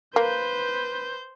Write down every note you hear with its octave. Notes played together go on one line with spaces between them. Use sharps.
A#3 B4 C5 G6